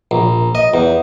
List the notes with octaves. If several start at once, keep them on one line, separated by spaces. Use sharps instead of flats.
A#1
D#5
E2